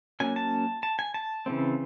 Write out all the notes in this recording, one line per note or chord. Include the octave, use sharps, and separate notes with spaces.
F#3 A#3 C#4 G#5
A5
A5
G#5
A5
C#3 E3 A3 C4